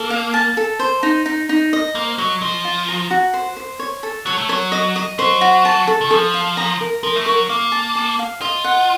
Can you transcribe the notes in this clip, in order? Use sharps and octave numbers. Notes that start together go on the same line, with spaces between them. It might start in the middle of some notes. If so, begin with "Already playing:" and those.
Already playing: A#3 A4
F5
A5
A4
C5
D#4
D#4
D#4
D#5
A#3 C5
F#3 D#5
F3 D#5
F4
A#5
F#4
C5
C5
C#5
A4
F#3 C#5
A3
F#3 C#5
D#5
D#5
F#3 C5
F#4
A5
A4
D#3
F3 A4
F5
A#5
A#4
F3 A#4
A3
F#3 A#4
A#3 F5
A5
A5
F5
F4 D#5
F#5